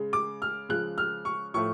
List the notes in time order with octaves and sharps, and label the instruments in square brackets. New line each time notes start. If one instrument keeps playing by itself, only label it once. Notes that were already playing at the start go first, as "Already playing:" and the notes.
Already playing: [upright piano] C#3 G#3
D6
F6
C#3 F3 G#3 F#6
F6
C#6
A2 F3 A3 C#6